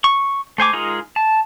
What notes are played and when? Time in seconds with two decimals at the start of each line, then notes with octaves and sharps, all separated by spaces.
0.04 C#6
0.58 A3 C5 G#5 D6
0.73 G#3 D#4 F4 G#4 A#4
1.16 A5